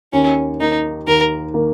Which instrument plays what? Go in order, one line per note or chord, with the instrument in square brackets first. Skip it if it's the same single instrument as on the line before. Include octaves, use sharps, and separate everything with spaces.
[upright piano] D#2 [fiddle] C#4
[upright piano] D#3 A#3 [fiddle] D#4
[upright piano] D#2 [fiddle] A#4
[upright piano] D#3 A#3